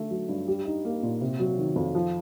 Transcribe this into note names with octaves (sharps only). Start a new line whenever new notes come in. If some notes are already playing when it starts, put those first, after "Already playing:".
Already playing: D3 A3
F#3
G2
G3
D#4
A#3
A#2
C3
F#3
D#3
F2
F3